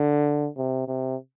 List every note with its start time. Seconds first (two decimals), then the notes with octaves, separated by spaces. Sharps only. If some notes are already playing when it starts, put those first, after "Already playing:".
Already playing: D3
0.57 C3
0.88 C3